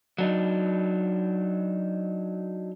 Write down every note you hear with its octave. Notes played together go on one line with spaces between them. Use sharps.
F#3 D4 D#4